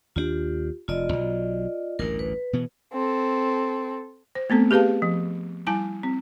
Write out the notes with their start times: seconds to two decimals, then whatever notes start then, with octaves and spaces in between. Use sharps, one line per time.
0.16 D#2 A#3 D4 F4 G4
0.88 F1 F4 D5 D#5
1.13 B1 B2 F#3
1.99 A1 D2 G2 A#4
2.19 B4
2.53 B2 E3 B3
2.93 C4 A4
4.35 C5
4.50 A3 B3 C4 A4
4.71 G4 G#4 B4 F5 A5
5.02 F3
5.67 G3 E4 G#5 A5
6.03 C4